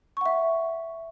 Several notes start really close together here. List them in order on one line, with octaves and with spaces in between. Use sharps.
C#6 F#5 E5